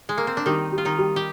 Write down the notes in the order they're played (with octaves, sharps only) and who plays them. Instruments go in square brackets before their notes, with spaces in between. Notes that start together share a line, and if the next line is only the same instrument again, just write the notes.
[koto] G#3
A#3
C4
D4
[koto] D#3 D#4 [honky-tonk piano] G3
[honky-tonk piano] G3
[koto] F4
D#3 D#4
[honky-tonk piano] G3
[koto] G4